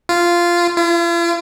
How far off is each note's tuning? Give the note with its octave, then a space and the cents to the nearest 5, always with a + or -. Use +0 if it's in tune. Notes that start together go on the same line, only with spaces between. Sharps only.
F4 -10
F4 -45